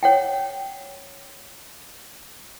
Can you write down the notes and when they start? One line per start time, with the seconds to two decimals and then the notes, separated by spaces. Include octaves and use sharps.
0.03 C#5 F#5 G5